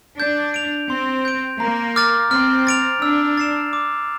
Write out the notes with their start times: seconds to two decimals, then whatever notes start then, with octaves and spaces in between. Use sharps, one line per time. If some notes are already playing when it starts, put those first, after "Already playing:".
0.19 D4 G6
0.54 D7 F7
0.90 C4 C6
1.25 G6 D7
1.60 A#3 A#5
1.96 D6 F6 A6
2.31 C4 F6
2.67 A6 D7 F7
3.02 D4 E6
3.37 A6 C7 E7
3.73 D6